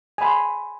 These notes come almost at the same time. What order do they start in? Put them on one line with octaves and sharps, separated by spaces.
G#5 B5 C6